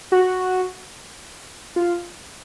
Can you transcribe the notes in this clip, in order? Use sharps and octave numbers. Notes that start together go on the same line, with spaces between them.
F#4
F4